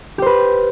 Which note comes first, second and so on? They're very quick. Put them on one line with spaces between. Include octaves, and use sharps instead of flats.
G4 C5 B4